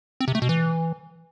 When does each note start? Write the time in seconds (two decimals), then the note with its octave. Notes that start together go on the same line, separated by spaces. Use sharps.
0.21 C4
0.28 C3
0.35 A3
0.42 B2
0.49 E3